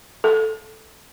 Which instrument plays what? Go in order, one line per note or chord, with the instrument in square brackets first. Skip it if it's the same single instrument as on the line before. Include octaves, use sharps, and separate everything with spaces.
[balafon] A4